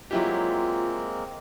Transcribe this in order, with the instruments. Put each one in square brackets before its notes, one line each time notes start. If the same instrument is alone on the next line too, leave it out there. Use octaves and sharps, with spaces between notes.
[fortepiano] F#3 E4 G4 [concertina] G#3 A#3 C4 [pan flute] F4